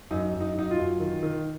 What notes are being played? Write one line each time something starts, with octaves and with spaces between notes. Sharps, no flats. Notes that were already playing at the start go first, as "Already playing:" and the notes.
F#2 D#4
F#2
D#4
F#3 D#4
F4
F#2
D#3
D#3